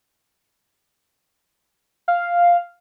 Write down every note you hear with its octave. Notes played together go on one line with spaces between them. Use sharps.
F5